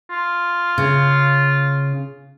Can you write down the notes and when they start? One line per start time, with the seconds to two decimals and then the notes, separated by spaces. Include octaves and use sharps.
0.10 F4
0.78 C#3